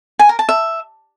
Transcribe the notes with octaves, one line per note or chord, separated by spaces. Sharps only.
G#5
A#4
A5
E5